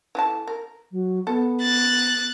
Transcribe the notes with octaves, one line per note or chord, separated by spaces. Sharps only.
E3 A3 A5
A#4
F#3
B3 A4
F#6 A6